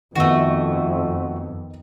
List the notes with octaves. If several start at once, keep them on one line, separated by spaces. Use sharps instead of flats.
F2 D#3 A3 B3 F#4